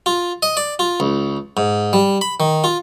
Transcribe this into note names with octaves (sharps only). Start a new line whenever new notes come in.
F4
D#5
D5
F4
C#2
G#2
G3
B5
D#3
F4